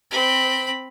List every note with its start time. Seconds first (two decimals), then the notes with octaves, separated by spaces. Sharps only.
0.11 C4 B5